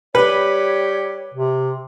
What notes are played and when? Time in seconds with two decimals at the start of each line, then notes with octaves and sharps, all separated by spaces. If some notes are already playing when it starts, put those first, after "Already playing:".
0.15 G3 G4 B4 C#5
1.34 C3